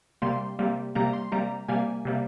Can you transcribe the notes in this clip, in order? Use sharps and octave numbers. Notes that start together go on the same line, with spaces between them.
C3 G3 A#3 C6
C3 G3 A#3
C3 G3 A#3 A#5
C6
C3 G3 A#3 A#5
C3 G3 A#3 G#5
C3 G3 A#3